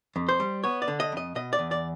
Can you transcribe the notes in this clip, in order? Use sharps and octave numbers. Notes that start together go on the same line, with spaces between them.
F2
C5
G3
B3 C#5
D5
D3
D#5
F2 D#5
B2 D#5
D5
E2
D5